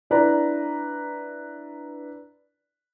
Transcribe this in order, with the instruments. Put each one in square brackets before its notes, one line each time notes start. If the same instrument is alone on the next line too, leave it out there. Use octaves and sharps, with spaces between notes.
[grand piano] D4 E4 B4 D5 A#5